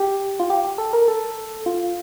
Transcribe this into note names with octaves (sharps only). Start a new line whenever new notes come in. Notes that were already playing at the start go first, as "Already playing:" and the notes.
Already playing: G4
F4
G4
G4
A4
A#4
A4
F4